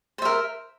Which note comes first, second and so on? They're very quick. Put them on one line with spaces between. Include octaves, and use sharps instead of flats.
C5 E5 A#4